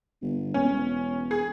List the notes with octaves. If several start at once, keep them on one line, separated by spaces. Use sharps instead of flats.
G1
E1 C#4
G#4